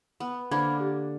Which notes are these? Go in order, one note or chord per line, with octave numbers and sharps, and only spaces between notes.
B3
D3 A#3 D4 C5 B5 G#6
G4 D6